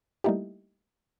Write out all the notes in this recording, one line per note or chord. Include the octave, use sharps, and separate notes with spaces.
G3 A3 A#3 D#4 E4 G4